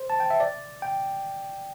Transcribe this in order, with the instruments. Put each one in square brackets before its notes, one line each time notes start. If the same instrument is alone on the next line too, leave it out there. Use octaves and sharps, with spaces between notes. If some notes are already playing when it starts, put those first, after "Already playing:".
Already playing: [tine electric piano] C5
A5
G5
E5
D5
G5